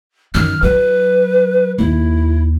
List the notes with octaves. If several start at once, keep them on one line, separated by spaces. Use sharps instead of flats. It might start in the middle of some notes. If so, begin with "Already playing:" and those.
F#2 D#3 F6
F#3 B4
D#2 E4